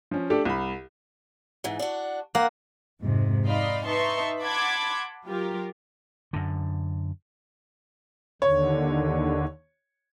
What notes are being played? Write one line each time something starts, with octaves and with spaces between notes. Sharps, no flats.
F3 C#4
A3 D4 G4 A4 D5
C2 B5
G#2 E3
D4 F#4
A#3 F#5
F2 G#2 C3
D#4 D5 D#5 F5 B5 C6
D#4 B4 E5 A5 C6 C#6
F#5 A5 B5 C6 D6 G#6
F#3 F4 G4 A#4
F#2 D3
D#2 D3 C#5